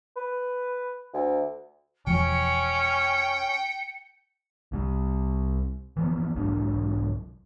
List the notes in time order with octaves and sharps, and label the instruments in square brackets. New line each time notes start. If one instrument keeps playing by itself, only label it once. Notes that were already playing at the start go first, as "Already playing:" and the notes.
[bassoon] B4
D2
[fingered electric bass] E1 F3 [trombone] C#4 [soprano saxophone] G5 [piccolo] C#7
[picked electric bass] C2 C3 G3
E3 F3 B3
B1 G#2 F#3 D4